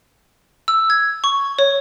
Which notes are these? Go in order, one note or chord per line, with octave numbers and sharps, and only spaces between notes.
E6
G#6
C#6
C#5